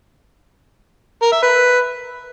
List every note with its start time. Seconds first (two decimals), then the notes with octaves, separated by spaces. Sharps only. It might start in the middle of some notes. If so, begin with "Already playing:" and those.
1.22 A#4
1.32 E5
1.42 B4